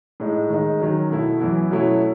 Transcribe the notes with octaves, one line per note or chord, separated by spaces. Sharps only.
A2 G#3 D#4
D#3 G#3 D#4
D#3 F#3 C#4
B2 A3 E4
F#2 E3 B3 E4
B2 F#3 A3 C#4 E4